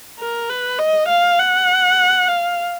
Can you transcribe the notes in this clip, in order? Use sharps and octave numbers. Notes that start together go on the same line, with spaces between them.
A#4
B4
D#5
F5
F#5
F5